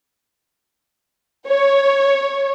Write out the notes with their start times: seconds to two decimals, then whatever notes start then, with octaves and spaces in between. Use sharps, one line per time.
1.48 C#5